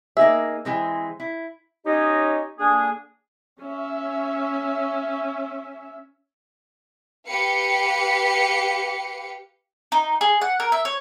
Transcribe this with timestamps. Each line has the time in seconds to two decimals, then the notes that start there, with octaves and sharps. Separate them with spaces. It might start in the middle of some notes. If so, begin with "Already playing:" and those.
0.17 A#3 D#4 G#4 E5
0.65 E3 G#3 C4
1.20 E4
1.86 C#4 D#4 G4 C#5 D#5
2.59 D3 A#3 D4 G#4
3.60 C#4 E5
7.27 G4 B4 F5 C#7
9.92 D#4
10.21 G#4
10.41 F#5
10.60 A#4
10.72 E5
10.85 C#5